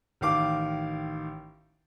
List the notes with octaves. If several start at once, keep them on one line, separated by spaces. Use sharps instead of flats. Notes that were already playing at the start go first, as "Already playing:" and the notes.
A1 D#3 F5 D6